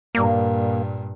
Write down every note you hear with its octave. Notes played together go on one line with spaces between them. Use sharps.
G2 A#2 A#3